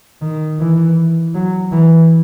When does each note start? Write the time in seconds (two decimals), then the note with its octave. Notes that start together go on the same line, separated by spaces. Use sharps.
0.21 D#3
0.60 E3
1.34 F#3
1.72 E3